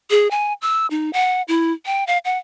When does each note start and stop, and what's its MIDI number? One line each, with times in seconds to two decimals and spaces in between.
0.10 0.30 68
0.31 0.53 80
0.62 0.86 88
0.91 1.11 63
1.13 1.42 78
1.48 1.72 64
1.86 2.04 79
2.07 2.18 77
2.25 2.38 78